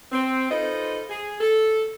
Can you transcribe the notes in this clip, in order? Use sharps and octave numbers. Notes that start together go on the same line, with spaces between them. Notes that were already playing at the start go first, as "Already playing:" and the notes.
C4
D#4 F4 A4 B4 C5 D#5
G#4
A4